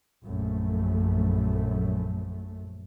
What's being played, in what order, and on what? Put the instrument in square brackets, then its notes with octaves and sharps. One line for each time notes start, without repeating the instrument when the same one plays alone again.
[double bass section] A#1 F#2 A3